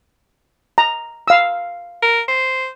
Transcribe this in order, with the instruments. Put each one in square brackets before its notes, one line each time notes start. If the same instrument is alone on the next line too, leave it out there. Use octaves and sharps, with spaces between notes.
[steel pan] A#5
F5 E6
[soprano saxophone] A#4
C5